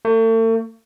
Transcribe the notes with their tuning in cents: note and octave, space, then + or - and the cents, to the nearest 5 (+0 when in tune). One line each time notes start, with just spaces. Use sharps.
A3 +40